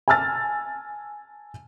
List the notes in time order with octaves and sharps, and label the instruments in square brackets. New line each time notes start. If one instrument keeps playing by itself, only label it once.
[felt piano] G#5 A5 E6 F6 A6